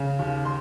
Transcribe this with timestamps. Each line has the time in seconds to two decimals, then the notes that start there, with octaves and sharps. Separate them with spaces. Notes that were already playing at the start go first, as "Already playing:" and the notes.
Already playing: C#3
0.19 D#2
0.45 C6